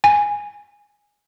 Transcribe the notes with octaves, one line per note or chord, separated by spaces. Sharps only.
G#5